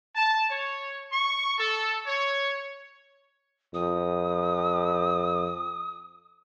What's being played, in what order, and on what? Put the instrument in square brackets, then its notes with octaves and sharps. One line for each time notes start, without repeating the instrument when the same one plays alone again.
[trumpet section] A5
C#5
C#6
A4
C#5
[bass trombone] F2 [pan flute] D#6